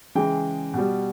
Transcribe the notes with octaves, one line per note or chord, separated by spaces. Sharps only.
C#3 E3 G#3 G5
B2 G3